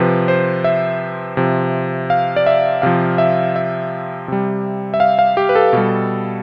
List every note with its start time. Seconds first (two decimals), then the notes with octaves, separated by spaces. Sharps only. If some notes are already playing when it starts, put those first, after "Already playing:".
Already playing: C3 F3 B4
0.28 C5
0.64 E5
1.37 C3 F3
2.10 F5
2.36 D5
2.46 E5
2.82 C3 F3 F5
3.18 E5
3.56 E5
4.28 C3 G3
4.94 E5
5.00 F5
5.19 F5
5.37 G4
5.49 B4
5.55 A4
5.73 B2 G3